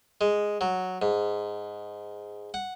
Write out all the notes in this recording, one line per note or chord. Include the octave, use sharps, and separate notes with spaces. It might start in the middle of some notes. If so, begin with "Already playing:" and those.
G#3
F#3
G#2
F#5